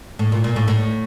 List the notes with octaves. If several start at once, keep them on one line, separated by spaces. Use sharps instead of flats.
A2
A#2
A#2
A2
A2